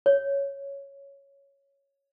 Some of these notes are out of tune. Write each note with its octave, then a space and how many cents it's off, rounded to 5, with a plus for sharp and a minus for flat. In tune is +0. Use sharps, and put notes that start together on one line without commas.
C#5 +0